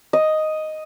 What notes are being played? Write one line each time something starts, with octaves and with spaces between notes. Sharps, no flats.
D#5